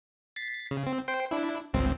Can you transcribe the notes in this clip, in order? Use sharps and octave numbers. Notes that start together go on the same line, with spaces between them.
A6 B6 C7
C#3
C4
C5 G5 C7
D4 E4
G#1 C#2 C4